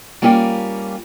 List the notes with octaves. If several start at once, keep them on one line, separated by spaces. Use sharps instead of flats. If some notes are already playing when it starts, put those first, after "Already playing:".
G3 A#3 C#4 F4 G4